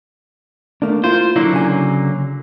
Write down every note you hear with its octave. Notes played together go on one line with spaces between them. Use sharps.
A3 A#3 D4
A#3 E4 F4 C5
D3 F#3 A#3 E4
C#3 G#5